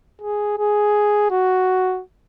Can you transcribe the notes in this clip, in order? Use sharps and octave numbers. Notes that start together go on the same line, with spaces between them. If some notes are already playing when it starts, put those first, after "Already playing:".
G#4
G#4
F#4